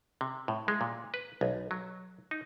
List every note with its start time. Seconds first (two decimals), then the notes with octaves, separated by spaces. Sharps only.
0.21 C3
0.48 A2
0.68 G#3
0.81 A#2
1.14 B4
1.41 B1
1.71 F#3
2.31 D#4